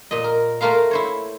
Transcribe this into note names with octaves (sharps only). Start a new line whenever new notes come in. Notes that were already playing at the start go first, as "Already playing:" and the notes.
A#2 D#5
A#4
A3 A#3 F4 A#4 F5
E4 C5 C#5